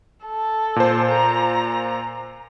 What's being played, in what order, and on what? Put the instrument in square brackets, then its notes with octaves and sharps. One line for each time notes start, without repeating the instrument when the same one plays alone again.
[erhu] A4
[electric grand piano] A#2 C5
[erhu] A#5